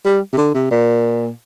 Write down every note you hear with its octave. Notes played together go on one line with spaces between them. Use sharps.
G3
C3
D3
C3
A#2